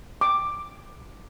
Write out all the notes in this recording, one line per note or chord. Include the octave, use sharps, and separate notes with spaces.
D6